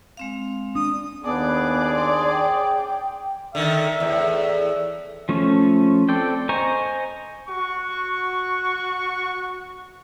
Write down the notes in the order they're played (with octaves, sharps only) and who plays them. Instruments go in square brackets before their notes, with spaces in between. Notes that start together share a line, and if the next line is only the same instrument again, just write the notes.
[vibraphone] G#3 C4 F5
[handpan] D4 [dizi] D#6
[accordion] D#2 D4 [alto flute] B3 [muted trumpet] G#4 [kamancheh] D5 D6
[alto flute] C6
G5
[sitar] D3 D#3 [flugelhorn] E5
[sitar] E2 A2
[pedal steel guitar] F3 A3 C#4
C4 A4 D5 G5
C5 D#5 G#5 A#5 C#6
[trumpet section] F#4 C#6